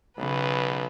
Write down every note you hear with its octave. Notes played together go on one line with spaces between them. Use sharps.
B1 C#3 B4